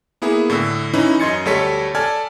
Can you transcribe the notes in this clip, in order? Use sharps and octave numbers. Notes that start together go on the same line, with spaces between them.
A#3 B3 E4 G#4
A2 D3 E6
E3 C#4 D#4 E4
F#2 D#5 C6 G#6 A6 C#7
D2 G3 A4 C#5 B6 C#7
A4 D5 G#5 A5 F6 G#6